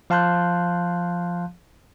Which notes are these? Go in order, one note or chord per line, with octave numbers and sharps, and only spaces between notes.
F3 F5 A5 C6 F#6 G6